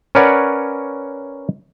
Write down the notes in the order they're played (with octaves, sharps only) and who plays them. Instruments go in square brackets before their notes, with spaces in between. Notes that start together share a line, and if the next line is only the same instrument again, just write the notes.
[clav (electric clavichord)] C#4 A#4 B4 C#5 D5 F#5